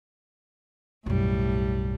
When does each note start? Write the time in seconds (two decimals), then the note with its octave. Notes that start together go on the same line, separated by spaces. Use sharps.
1.06 B1 F#2 A2 G3